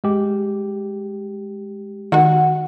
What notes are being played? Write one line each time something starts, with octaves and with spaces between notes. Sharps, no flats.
G#3 G4
D#3 F#4 F#5